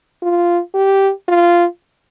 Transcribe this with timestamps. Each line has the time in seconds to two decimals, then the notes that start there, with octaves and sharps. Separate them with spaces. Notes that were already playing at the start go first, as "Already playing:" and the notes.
0.22 F4
0.74 G4
1.28 F4